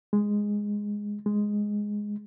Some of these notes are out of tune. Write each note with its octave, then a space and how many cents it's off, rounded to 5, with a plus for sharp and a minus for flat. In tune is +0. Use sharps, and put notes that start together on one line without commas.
G#3 -5
G#3 +0